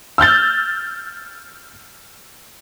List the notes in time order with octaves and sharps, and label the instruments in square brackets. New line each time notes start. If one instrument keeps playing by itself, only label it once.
[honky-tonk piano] E6 F6 G6 A6